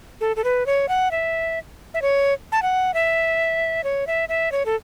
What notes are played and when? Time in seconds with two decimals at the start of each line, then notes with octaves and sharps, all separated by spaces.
0.21 A4
0.36 A4
0.44 B4
0.66 C#5
0.89 F#5
1.11 E5
1.94 E5
2.02 C#5
2.52 A5
2.62 F#5
2.94 E5
3.84 C#5
4.07 E5
4.29 E5
4.52 C#5
4.66 A4